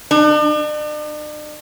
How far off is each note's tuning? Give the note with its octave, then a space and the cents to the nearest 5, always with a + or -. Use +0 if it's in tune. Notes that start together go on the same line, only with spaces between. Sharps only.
D4 +45